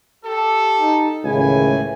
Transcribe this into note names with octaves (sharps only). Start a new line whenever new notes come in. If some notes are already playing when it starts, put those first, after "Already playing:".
G4 A4
D#4
C#2 A2 D#3 E3 E4 G#5